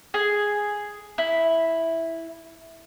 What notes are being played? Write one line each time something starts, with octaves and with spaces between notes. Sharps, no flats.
G#4
E4